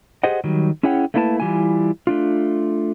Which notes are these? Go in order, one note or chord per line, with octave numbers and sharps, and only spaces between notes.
G4 G#4 C5 D#5 F#5
D#3 F#3 G3
C#4 E4 G#4 C#5 F#5 G5
A3 A#3 D4 E4 B4 A5
E3 G3 E4 F4 G#5
A3 D4 F4